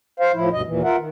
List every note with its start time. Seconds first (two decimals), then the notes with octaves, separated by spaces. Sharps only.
0.20 C5 F5
0.34 A2 F3 E4
0.53 D2 G2 B2 D#5
0.66 D#2 A#2 E3
0.84 F4 A#4 E5 F#5
0.97 D#3